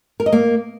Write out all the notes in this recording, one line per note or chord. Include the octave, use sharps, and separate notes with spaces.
A#4
D#5
A#3